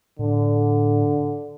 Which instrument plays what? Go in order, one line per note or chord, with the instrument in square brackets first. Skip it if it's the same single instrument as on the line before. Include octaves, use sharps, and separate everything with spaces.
[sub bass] A2 [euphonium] D3